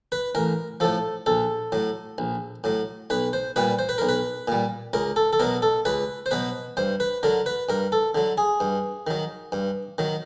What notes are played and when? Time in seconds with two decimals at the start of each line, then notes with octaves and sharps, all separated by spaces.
0.12 B4
0.35 A1 A#4
0.80 A2 F3 A4
1.26 A#1 A4
1.72 A2 F#3
2.18 A#1
2.64 A2 F#3
3.10 B1 B4
3.33 C5
3.56 A#2 G3 B4
3.79 C5
3.89 B4
3.98 B1 A#4
4.09 B4
4.48 A#2 G3
4.93 C#2 A#4
5.16 A4
5.33 A4
5.39 B2 F#3 A#4
5.62 A4
5.85 C#2 B4
6.26 C5
6.31 B2 F#3 B4
6.77 G2 C5
7.00 B4
7.23 D3 F#3 A#4
7.46 B4
7.69 G2 A#4
7.92 A4
8.15 D3 F#3
8.38 G#4
8.60 G2
9.07 D#3 F#3
9.52 G2
9.98 D#3 F#3